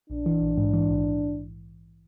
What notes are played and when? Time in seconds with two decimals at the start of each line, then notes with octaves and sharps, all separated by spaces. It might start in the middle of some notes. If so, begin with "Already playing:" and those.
0.10 A#1 D4
0.26 E3
0.42 A#1
0.58 G#2
0.73 E3
0.90 A#1